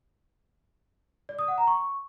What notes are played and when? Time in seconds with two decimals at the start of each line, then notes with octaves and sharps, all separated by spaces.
1.29 D5
1.39 D#6
1.48 F#5
1.58 A#5
1.67 C#6